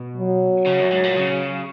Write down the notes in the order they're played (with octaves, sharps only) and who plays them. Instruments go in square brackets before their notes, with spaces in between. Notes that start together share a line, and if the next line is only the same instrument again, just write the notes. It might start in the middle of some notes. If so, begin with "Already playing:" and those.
Already playing: [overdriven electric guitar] B2
[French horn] F#3
[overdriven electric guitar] C#3
F#2
G#2
A#2
C#3